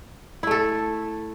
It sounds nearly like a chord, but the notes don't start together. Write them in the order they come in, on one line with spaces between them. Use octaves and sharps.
E4 A3 A4